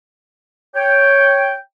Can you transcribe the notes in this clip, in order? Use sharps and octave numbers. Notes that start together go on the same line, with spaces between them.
C#5 G5